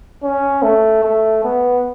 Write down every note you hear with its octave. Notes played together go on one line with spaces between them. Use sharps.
C#4
A3
A3
B3